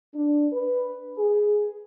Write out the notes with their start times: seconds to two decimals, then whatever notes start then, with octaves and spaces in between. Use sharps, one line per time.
0.14 D4
0.52 B4
1.17 G#4